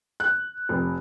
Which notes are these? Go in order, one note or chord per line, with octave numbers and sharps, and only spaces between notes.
F#6
F1